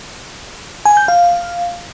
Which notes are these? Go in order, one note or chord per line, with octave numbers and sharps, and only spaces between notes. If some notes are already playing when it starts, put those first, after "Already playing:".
G#5
G6
F5